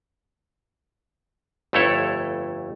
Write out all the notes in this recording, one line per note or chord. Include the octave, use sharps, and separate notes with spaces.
G1 F2 A3 E4 A4 C#5